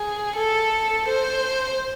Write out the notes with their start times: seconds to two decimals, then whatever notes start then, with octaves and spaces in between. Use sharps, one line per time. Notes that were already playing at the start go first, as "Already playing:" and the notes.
Already playing: G#4
0.36 A4
1.08 C5